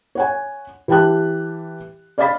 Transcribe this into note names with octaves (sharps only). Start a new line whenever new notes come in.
C#5 F#5 G#5
E3 G4 G5 A5 F#6
D5 D#5 F5 B5 A6 B6